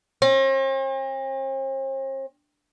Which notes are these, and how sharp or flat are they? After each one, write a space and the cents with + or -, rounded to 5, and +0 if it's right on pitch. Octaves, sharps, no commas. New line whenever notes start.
C4 +45